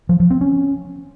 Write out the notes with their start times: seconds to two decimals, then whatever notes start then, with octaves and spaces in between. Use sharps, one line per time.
0.09 F3
0.20 F3
0.30 C4
0.41 C#4